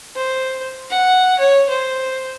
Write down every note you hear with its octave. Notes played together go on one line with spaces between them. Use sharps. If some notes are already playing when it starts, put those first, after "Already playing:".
C5
F#5
C#5
C5